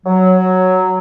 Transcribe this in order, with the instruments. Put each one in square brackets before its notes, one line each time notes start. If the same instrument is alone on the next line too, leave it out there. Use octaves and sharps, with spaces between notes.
[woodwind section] F#3